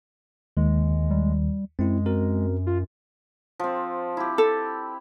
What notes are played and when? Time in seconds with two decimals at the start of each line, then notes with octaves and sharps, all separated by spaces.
0.57 D#2 D#3 G#3
1.11 G3
1.79 F#2 G#3 C4 E4
2.06 C4 F#4 A#4
2.67 F4
3.60 F3 C4
4.17 E4 G4
4.38 A4